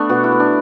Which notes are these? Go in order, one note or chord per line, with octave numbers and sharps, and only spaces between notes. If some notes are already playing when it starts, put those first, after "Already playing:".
Already playing: A3 B3 D4
B2 F#4
E4
A3
D4